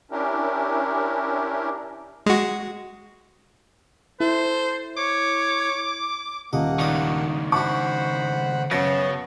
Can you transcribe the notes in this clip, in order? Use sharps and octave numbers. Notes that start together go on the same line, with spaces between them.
C#4 D4 E4 G4 A#4
G#3 F#4
E4 A4 C5
C#5 D6
D#1 A#3 D#5 F#5
C#2 D#3 D5 D#6
E4 F#4 C5 F#5 B5 C#6
F#2 C#3 B3 E5 A5 A#6